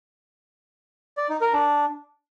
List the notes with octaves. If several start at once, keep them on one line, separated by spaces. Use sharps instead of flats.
D5
D#4
A#4
D4